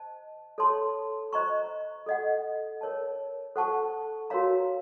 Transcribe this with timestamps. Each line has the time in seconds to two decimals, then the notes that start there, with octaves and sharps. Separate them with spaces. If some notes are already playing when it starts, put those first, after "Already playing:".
Already playing: C5 D#5 A5
0.58 A4 C#5 A5 C6
1.33 C5 D#5 A#5 C#6
2.06 A4 D#5 F#5
2.81 A#4 C#5 A5
3.56 A4 C5 F#5 A5 C#6
4.30 F#4 A#4 C#5 F5 A#5